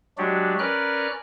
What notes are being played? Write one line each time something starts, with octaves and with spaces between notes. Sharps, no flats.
F#3 G#3 D4 F#4 G4
C#4 A#4 B4 D5 F6 F#6